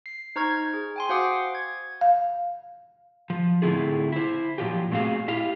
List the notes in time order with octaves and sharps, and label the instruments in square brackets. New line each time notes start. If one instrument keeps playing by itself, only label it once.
[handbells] C7
D#4 C5 A#5 C#6 F6 G#6
G#4
G5 G#5 C6
F#4 C5 F5 F#5 D6 D#6
G#6
[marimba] F5
[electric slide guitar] F3
A2 D3 C4 E4 F4 G#4
E4 C5
A#2 F3 F#3 F4 G4
A#2 A3 C4 F#4 G#4 F5
E4 G4 F5